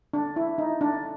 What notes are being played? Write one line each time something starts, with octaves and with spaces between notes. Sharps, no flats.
D4
E4
D#4
D4